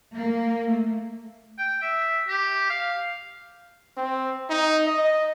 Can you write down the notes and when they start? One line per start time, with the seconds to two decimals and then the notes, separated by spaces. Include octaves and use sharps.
0.16 A#3
0.71 A3
1.58 G5
1.82 E5
2.28 G4
2.70 F5
3.97 C4
4.50 D#4
4.86 D#5